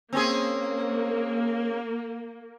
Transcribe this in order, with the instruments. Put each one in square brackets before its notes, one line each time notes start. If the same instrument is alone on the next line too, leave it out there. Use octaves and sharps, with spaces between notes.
[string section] A#3 [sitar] C4 C#4 G#4